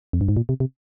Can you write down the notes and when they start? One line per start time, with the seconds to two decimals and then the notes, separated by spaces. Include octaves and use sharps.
0.13 F2
0.21 G2
0.29 G#2
0.37 A#2
0.49 C3
0.60 C3